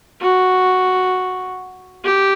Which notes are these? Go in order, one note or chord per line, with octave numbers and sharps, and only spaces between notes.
F#4
G4